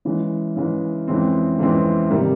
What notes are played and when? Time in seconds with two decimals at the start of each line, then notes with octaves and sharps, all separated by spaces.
0.05 C#3 E3 G#3
0.56 C#3 E3 G#3
1.08 F2 C#3 E3 G#3 C4
1.59 F2 C#3 E3 G#3 C4
2.10 C3 D#3 G3 A#3